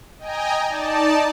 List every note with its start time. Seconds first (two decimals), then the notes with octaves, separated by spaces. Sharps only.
0.19 D#5 G5 G#5 A#5
0.68 D#4 D5 A5